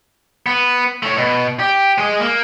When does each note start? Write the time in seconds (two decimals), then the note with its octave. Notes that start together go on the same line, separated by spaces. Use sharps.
0.46 B3
1.03 A3 C#5
1.17 B2
1.59 G4
1.98 G#3 D#5
2.20 A#3